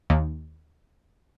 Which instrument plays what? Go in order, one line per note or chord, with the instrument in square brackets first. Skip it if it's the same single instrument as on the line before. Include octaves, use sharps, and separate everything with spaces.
[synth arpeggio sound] D#2